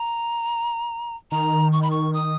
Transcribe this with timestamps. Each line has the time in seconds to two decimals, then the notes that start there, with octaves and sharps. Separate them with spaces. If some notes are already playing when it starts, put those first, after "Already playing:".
Already playing: A#5
1.31 D#3 A#5
1.72 C#6
1.82 B5
1.91 C#6
2.14 D#6